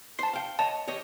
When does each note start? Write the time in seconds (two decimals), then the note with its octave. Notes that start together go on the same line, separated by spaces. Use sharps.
0.19 C5 A5 C6 C7
0.33 F5 G5
0.59 C#5 D#5 A5
0.88 G4 C#5 D#5